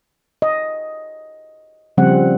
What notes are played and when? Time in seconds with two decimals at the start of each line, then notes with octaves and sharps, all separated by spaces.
0.42 D#5
1.97 C#3 F3 G3 C4 F#5